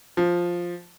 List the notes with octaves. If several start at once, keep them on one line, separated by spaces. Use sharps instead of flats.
F3